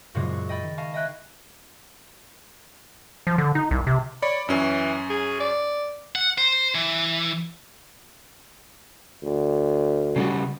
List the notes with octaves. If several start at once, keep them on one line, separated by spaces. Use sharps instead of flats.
F#2 A#2 C#3 F#3 G#3 C4
C#6
D#5 G5 B5 A6
D#3
D#5 F5 G#5 A5 C#6
D#5 E5 G5 F#6 G#6
F3
D3
D#4
C2
C3
C#5 D5 B5
F#2 E3 C#4
G#4
D5
F#5
C5
E3
D2
C#3 G3 F#4